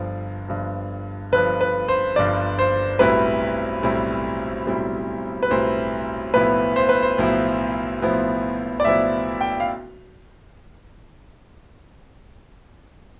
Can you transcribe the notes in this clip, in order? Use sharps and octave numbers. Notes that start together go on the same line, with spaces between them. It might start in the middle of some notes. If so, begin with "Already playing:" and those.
Already playing: G1 G2 F3
G1 G2 F3
G1 G2 F3 B4
B4
C5
G1 G2 F3 D5
C5
B1 A2 G3 C4 E4 B4
B1 A2 G3 C4 E4
B1 A2 G3 C4 E4
B4
B1 A2 G3 C4 E4 C5
B1 A2 F3 B3 E4 B4
C5
B4
C5
B1 A2 F3 B3 E4
B1 A2 F3 B3 E4
D5
B1 A2 F3 B3 E4 E5
G5
F5